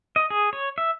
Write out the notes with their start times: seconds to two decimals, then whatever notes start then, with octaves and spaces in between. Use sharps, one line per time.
0.16 D#5
0.30 G#4
0.53 C#5
0.78 E5